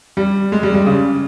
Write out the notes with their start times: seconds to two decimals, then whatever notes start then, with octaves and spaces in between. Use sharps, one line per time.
0.17 G3
0.52 G#3
0.63 G3
0.74 G3
0.86 C#3